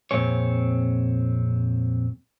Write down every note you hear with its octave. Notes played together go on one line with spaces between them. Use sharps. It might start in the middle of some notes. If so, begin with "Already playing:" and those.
F2 A#2 C4 G#4 C#5